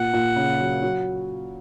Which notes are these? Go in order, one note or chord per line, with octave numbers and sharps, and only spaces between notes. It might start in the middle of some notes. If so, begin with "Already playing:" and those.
Already playing: A#2 F#5
A#2
C#3
F#3
F#3